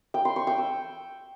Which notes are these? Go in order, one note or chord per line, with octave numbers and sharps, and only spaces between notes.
G5
C6
C#6
G5
E6